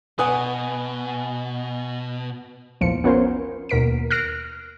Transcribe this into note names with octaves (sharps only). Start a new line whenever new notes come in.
B2 B4 F#5 G#5 D#6
A#1 E2 F3 C#7
B3 C#4 F4 A#4 C5
D#2 B2 A#4 B6 D7
F6 F#6 A#6 C7 D7